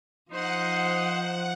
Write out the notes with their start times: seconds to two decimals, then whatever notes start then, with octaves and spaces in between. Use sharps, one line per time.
0.32 F3 D#4 C5 F#5